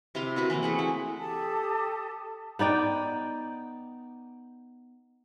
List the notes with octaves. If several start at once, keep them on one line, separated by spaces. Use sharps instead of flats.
C3 E4 F5 C6
E4 F#4 A#4 B4
E3 A#3 C4 E4
A3 G#4 F#5
E4
G4 A4 A5 D#6
B3 D#4 D5 G5